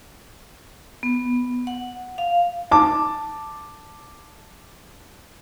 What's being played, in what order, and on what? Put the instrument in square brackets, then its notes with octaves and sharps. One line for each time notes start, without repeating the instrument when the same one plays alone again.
[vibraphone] B3
F#5
F5
[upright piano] A5 D6